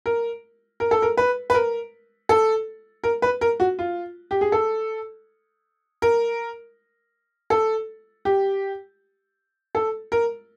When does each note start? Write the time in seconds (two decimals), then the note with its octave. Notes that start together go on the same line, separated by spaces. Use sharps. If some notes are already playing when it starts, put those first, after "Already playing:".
0.06 A#4
0.80 A#4
0.91 A4
1.02 A#4
1.17 B4
1.50 B4
1.54 A#4
2.29 A4
3.04 A#4
3.22 B4
3.41 A#4
3.60 F#4
3.79 F4
4.31 G4
4.41 G#4
4.52 A4
6.02 A#4
7.50 A4
8.25 G4
9.75 A4
10.12 A#4